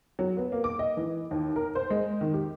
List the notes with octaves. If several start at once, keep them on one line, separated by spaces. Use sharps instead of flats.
F#3
B3
A#3
D6
D#5
E3
D#2
A#4
C5
G#3
D#3
G4